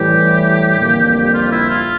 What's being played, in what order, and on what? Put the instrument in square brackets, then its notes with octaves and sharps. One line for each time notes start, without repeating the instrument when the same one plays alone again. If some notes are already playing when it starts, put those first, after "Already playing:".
Already playing: [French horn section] A2 E3 G3 [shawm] G4
[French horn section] F2 D3 G3 A#3
[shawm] G4
F4
E4
F4